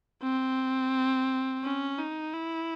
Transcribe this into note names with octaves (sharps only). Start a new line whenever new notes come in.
C4
C#4
D#4
E4